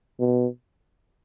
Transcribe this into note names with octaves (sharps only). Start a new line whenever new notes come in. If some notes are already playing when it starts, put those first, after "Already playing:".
B2